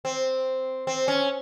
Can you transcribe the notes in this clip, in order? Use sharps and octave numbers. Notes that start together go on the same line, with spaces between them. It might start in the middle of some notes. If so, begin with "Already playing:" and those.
C4
C4
C#4